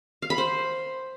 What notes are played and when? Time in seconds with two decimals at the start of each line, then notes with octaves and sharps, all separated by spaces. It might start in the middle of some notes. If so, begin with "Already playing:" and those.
0.22 F5
0.30 B5
0.38 C5